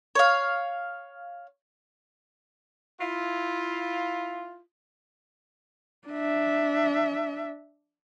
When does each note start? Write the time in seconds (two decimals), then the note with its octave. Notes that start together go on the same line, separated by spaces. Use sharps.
0.15 C#5 F5
3.00 E4 F4
6.08 D4 E5